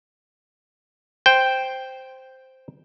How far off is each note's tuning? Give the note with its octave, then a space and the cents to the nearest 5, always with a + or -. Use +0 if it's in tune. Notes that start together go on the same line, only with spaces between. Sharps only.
C5 +0 G5 +0